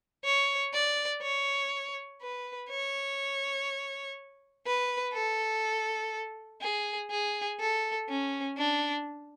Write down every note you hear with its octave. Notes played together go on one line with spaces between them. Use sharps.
C#5
D5
C#5
B4
C#5
B4
A4
G#4
G#4
A4
C#4
D4